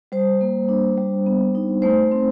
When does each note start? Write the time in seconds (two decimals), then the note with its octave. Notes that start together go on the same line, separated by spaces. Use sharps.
0.12 G3 C5
0.41 A#3
0.69 D4
0.98 G3
1.26 B3
1.55 D#4
1.82 A3 C5
2.11 C4